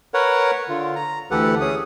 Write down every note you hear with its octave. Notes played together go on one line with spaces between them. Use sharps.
A#4 B4 C#5 F#5
D3 F4
A#5
D2 E3 G4 A4 B4 F#5
C#4 G#4 D#6